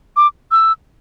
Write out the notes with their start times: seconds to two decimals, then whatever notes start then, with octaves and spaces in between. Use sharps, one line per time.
0.17 D6
0.51 E6